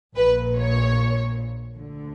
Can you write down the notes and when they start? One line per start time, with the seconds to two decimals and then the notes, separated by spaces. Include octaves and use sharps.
0.16 A#1 A#2 B4
0.57 C#5
1.77 D2 D3